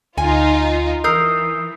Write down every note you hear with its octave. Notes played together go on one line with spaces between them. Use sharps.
D2 D#4 F4 G#5
E3 A#4 D#6 E6 G6 C7